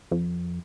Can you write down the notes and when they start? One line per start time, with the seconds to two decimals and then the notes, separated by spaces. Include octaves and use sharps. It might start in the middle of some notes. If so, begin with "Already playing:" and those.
0.11 F2